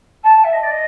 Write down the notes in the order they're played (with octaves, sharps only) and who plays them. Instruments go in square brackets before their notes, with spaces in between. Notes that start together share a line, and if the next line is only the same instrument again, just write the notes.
[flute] A5
E5
D#5
D5
D#5